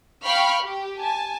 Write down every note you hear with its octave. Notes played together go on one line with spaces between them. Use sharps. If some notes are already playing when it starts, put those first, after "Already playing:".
F5 G5 B5 C#6 F6
G4
G#5 A5